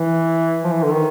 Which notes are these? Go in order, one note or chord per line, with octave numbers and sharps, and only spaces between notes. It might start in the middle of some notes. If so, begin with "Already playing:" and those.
Already playing: E3
F3
E3
D3
D#3